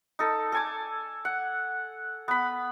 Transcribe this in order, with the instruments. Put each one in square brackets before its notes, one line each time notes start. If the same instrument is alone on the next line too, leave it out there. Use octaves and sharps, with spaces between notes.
[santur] D#4 A4
A4 G#5 D6
F#5
B3 B5